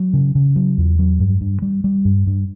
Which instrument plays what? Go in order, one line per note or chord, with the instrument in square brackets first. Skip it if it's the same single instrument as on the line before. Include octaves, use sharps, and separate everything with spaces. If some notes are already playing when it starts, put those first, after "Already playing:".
Already playing: [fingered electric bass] F#3
C#3
C#3
F#3
E2
F#3
G2
G2
G3
G3
G2
G2